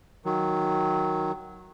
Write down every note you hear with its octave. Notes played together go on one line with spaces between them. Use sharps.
D#3 F#3